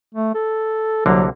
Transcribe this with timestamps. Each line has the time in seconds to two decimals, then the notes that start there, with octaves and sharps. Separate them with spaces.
0.15 A3
0.35 A4
1.06 C2 D3 F#3 A#3